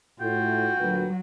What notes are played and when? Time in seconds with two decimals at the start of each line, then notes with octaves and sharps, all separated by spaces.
0.21 A2 F4 F#4 G5
0.80 D2 A#2 F#3 B4